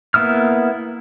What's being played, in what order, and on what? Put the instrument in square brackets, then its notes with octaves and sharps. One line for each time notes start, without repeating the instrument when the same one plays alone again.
[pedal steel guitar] A#3 B3 E4 D#6 F6